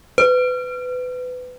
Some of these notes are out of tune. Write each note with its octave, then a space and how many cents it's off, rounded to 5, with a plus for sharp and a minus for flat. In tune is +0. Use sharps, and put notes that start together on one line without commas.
B4 +25